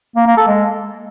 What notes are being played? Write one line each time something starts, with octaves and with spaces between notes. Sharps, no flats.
A#3
A#3
A4
G#3